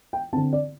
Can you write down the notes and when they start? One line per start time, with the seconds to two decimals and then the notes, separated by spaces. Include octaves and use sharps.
0.13 G5
0.33 C4 A5
0.36 D3
0.53 D5